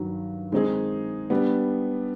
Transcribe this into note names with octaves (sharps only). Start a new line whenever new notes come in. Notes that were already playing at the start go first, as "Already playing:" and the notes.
Already playing: G2 D#3 F#3
D#3 G#3 C4 D#4 G#4
G3 B3 D4